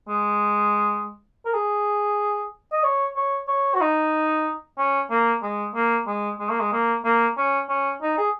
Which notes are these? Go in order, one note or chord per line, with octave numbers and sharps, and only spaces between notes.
G#3
A#4
G#4
D#5
C#5
C#5
C#5
F#4
D#4
C#4
A#3
G#3
A#3
G#3
G#3
A#3
G#3
A#3
A#3
C#4
C#4
D#4
G#4